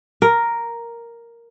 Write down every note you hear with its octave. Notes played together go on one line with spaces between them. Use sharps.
A#4